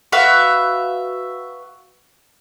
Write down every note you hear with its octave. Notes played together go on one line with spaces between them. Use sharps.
F#4 B4 E5 F5